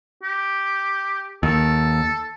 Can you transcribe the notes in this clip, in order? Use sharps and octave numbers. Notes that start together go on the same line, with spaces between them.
G4
D#2 A4